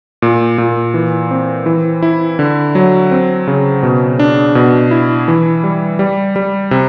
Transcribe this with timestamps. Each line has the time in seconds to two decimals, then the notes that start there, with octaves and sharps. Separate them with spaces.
0.22 A#2
0.58 A#2
0.94 E3
1.31 C4
1.66 E3
2.02 E4
2.39 D3
2.75 F#3
3.11 C4
3.48 C#3
3.83 B2
4.19 D4
4.55 B2
4.91 E4
5.28 E3
5.64 G3
5.99 G3
6.36 G3
6.71 C3